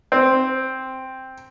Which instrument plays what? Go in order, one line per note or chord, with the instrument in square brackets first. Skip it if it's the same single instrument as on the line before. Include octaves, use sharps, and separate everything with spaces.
[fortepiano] C4